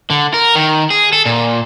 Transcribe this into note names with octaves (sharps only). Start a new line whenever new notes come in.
D3
A#4
D#3
G#4
A4
A#2